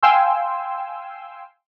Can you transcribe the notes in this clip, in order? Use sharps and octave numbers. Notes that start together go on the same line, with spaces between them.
F5 G5 G#5 C6 E6